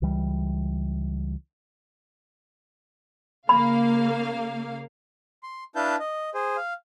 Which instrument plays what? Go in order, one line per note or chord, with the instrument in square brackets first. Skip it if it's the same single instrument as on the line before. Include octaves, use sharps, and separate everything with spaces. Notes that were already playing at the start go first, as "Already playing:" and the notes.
[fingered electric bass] C#2 E3 G3
[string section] C#3 A#3 F5 [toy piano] B5
[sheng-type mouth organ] C6
D4 E4 B4 F5 A5 G6
D#5
G#4 C5
F5